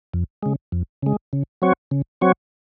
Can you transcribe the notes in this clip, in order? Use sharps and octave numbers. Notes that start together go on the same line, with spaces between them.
F2
C#3 G#3
F2
C#3 G#3
C#3
F#3 C4 F#4 C#5
C#3
F#3 C4 F#4 C#5